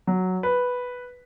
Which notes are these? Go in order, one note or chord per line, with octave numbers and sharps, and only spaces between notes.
F#3
B4